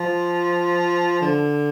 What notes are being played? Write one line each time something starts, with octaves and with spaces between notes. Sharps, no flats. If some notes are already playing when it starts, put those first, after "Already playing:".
Already playing: F3
D3